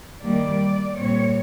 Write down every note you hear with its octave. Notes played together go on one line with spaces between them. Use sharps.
D#3 G3 A#3 D5
A#2 G3 C4 C#5